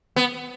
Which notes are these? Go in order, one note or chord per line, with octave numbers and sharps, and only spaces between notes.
B3